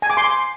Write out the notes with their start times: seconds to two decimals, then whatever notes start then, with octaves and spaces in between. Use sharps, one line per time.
0.02 G#5
0.10 D6
0.17 C6